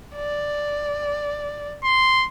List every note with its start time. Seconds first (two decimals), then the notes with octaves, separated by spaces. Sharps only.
0.15 D5
1.84 C6